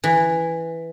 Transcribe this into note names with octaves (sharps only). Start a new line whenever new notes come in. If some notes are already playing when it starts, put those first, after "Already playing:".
E3